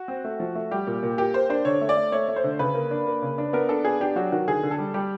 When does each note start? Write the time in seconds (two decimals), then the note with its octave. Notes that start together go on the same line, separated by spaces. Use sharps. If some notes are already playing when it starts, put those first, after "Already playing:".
Already playing: F#4
0.08 C4
0.24 A3
0.40 F3
0.55 A3
0.71 G3 G4
0.87 A#2
1.03 A#2
1.18 A#3 G4
1.34 A#3 C5
1.50 D4 C5
1.65 D3 C#5
1.81 A3
1.89 D5
1.96 A3
2.12 A3 C#5
2.28 A3
2.36 C5
2.44 D3
2.59 C#3 B4
2.75 A#3
2.91 D4
3.07 A#3
3.22 C#3
3.38 D4
3.53 B3 A#4
3.69 D4 A4
3.85 B3 G#4
4.01 D4 G4
4.16 F#3 F#4
4.32 D#3 F#4
4.48 D3 G#4
4.63 D3
4.71 A4
4.79 G3
4.94 G3 G4